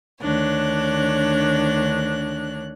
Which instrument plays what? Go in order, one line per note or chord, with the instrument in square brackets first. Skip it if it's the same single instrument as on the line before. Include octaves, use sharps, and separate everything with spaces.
[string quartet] D2 D#3 D4 C#5 F#6